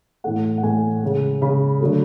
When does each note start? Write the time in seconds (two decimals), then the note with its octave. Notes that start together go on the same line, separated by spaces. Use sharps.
0.24 A2 E3 A3 F#5
0.58 F#5
0.63 A2 E3 A3 G#5
1.03 C#3 G#3
1.42 C#3 G#3 B5
1.81 D3 F#3 A3